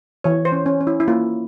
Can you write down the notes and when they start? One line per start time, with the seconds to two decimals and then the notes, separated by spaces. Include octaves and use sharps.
0.24 E3 C#5
0.45 C5
0.52 C#4
0.66 C#4
0.80 C#4
0.87 E4
1.00 E4
1.08 A#3 F4